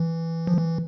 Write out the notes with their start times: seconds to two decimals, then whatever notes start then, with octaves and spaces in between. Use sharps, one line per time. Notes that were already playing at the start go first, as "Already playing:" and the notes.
Already playing: E3
0.47 F3
0.57 E3